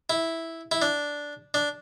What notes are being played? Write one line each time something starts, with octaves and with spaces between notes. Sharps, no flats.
E4
E4
D4
D4